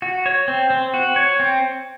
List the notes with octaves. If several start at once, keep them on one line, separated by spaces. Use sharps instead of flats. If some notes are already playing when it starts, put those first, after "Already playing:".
F#4
C#5
C4
C4
F#4
C#5
C4